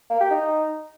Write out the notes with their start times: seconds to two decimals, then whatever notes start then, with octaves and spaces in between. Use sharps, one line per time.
0.10 A#3
0.20 G4
0.30 D#4